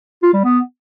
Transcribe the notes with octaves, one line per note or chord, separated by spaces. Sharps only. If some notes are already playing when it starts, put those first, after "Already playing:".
F4
G3
B3